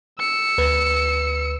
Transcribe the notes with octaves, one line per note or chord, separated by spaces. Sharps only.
E6 C#7
D2 B4